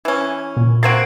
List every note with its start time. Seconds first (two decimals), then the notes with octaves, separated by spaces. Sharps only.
0.05 E3 C#4
0.57 A#2
0.83 A#3 C4 F#4 G#6 D7